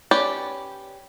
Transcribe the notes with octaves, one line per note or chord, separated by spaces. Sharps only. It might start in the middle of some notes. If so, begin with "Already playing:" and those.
C#4 G4 B4 D5